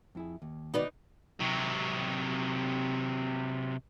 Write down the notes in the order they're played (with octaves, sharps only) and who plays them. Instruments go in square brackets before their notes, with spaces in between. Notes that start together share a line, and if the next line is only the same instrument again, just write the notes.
[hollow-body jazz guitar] F2 E4 G#4
D#2
[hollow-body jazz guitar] B2 D#3 F#4 [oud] D#4 B4 D5
[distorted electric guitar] C3 F#3